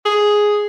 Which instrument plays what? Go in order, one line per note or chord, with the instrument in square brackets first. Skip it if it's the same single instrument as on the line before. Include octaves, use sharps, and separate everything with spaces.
[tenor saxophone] G#4